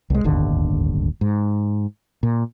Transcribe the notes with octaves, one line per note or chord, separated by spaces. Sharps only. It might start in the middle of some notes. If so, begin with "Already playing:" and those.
C2 G#3
D1 G1 D#2 D3
G#2
A#2